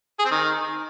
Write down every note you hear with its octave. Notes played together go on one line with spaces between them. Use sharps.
G#4
C4
D#3